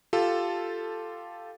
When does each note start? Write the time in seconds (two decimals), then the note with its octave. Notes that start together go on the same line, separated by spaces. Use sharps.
0.13 F4 G4 A4